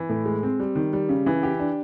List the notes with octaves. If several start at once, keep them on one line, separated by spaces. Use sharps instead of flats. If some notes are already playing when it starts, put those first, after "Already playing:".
Already playing: E3
A2
G#3
C4
G3
D#3
G3
C#3
E3
G4
D4